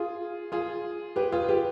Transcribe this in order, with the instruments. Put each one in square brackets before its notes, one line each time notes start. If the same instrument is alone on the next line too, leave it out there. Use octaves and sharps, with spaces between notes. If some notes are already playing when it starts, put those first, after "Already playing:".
Already playing: [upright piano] F4 G#4
F4 G#4
G4 B4
F4 G#4
G4 B4